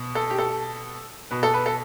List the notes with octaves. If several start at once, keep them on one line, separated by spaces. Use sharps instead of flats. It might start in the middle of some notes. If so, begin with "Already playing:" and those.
Already playing: B2
A4
G4
A4
B2 B4
A4
B4
A4